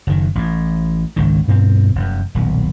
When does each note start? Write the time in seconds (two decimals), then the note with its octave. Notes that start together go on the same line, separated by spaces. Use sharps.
0.07 F#1 D#3
0.35 A1 A2
1.16 G#1 C#2 D#3
1.48 G2 B2 C4
1.95 F1 F#2
2.35 D#1 B1